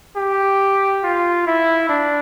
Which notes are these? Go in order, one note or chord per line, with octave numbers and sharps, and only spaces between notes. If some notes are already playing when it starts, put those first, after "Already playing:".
G4
F4
E4
D4